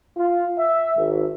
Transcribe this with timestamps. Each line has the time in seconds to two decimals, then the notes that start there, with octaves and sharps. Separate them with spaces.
0.17 F4
0.58 E5
0.96 G#1